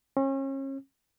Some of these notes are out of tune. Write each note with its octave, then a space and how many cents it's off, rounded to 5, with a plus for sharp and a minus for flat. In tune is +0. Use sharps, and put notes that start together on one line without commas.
C#4 -35